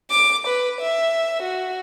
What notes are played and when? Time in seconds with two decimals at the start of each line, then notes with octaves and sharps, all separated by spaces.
0.11 D6
0.47 B4
0.81 E5
1.42 F#4